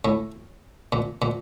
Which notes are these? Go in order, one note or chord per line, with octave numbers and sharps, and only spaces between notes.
A2
A#2
A#2